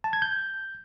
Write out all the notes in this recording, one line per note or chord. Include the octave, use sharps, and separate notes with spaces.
A5
G#6
G6